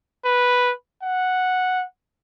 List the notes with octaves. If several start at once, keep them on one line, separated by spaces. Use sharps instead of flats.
B4
F#5